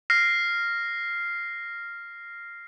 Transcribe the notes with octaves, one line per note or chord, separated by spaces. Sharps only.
F6 A#6 C7